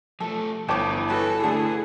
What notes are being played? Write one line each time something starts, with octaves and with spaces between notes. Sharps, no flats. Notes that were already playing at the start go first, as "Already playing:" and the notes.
F3 A3 A4
G1 E3 G4 C5 C#5 A5 D6
F#4 A4 B4
D3 A3 G#4 F#5 A5